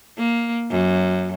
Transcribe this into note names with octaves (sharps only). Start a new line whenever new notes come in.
A#3
F#2